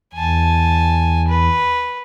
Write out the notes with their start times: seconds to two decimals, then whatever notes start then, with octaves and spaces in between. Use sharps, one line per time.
0.14 E2 G#5 A5
1.28 B4